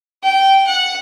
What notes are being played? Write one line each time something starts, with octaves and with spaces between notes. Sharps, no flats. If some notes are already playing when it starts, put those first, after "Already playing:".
G5
F#5